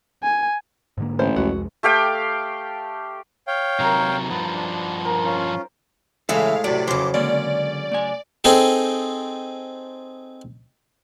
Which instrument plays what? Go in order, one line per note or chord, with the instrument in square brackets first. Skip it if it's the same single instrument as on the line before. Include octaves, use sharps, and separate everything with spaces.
[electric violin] G#5
[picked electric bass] G#2 D3 A#3
[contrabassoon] A1 [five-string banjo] C5
[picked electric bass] C2 F2 G#3 [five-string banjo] F#4
[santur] A3 G4 F5 G5
[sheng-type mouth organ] C#5 F5 G5
[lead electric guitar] C3 F#3 [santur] D#4 A#4
[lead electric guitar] G2 F3 [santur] B3
[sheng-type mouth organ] D4
[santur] A#4 C5 G5
[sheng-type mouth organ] C#4 F4
[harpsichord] A2 G#3 [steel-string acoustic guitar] C#3 E3 E5 [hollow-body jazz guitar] A4 [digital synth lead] F5
[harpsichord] A2 C3 [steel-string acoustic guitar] F#3 [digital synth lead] D5
[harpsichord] F2 E3 [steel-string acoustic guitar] C#3 F#3 [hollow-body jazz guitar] C5 [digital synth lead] D6
[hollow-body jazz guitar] D3 G#3 A#3 [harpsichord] C#4 [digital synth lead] D5
[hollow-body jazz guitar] A3 G#5
[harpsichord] C4 D#4 G#4 A4